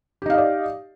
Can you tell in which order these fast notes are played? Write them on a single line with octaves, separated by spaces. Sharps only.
G4 D#4 F5 D#5 D5